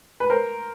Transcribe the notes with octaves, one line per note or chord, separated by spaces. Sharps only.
B4
A#4 C5